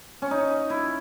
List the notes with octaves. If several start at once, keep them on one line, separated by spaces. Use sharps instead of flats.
C#4
D#4
E4